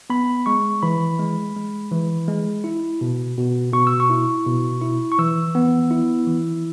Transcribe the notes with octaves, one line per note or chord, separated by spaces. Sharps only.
B3 B5
G#3 C#6
E3 B5
G#3
G#3
E3
G#3
E4
B2
B2
B2 C#6
E6
C#6
E4
B2
E4
C#6
E3 E6
B3
E4
E3